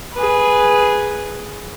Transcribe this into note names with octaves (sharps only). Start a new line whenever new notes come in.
G#4 B4